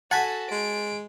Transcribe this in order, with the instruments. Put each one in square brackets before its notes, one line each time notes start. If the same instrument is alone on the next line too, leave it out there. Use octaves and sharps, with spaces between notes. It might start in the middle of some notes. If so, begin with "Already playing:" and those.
[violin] F#4 A4 [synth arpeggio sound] F#5 [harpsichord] G#5 A5 B5
[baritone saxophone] G#3 [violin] D7